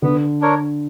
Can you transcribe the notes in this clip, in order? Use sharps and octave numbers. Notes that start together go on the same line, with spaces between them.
D3 B3
D4 A#4 C#5